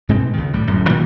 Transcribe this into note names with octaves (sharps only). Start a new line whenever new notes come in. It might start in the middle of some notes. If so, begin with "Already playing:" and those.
G#2 B2 G#3 C4
C#2 D#3
A2 G3
D1 F#2
A#2 D#3 G3 A#3